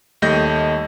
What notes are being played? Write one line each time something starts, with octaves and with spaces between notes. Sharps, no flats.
D#2 G3 A3 D#5 G6 A#6